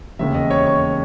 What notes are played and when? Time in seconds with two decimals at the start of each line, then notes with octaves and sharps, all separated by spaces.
0.19 E1 D#2 C#3 E5
0.35 D#5
0.51 C#5
0.67 C#5